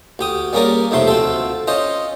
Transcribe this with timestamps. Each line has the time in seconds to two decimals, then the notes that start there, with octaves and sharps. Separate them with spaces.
0.19 D2 G4 D#6
0.53 G3 A#3 C#4 G#4 A#4 D5
0.91 F2 G#2 C3 A3 C6
1.08 D2 C4 F4 A4
1.67 C#4 F4 C5 D#5